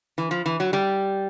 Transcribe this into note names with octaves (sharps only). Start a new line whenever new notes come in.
E3
F3
E3
F#3
G3